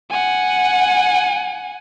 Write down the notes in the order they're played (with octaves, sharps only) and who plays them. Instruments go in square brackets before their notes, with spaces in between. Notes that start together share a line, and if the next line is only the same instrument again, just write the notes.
[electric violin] F#5 G#5